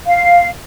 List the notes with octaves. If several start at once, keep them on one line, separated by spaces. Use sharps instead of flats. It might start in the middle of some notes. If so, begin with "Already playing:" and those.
F5